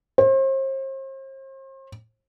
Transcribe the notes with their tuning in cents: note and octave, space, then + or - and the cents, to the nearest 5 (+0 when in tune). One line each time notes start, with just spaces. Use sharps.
C5 +40